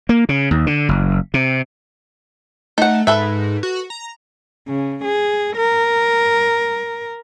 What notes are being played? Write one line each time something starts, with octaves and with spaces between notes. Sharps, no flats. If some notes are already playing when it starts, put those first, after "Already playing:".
A#3
C#3
D#2
D3
F#1
C3
A3 D#4 F#5
G#2 A4 B4 E5
F#4
A#5
C#3
G#4
A#4